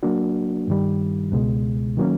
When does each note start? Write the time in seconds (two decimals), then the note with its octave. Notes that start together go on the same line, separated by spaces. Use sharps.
0.03 F#3 A#3 D4 F#4
0.68 G2 D#3 G3
1.32 C#2 B2 G#3
1.97 D#3 F#3 A#3 C#4